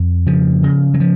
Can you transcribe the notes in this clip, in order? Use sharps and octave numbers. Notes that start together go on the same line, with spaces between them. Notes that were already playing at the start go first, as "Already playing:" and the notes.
Already playing: F2
C#3 F3
C#3
F#3
F3